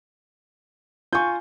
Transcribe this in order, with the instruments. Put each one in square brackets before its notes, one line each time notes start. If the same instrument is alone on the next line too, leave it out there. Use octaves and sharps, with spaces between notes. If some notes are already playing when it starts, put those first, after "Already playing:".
[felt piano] F4 G#5 [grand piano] C#6 G6